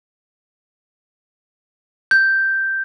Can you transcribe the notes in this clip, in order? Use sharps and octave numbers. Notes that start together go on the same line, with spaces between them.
G6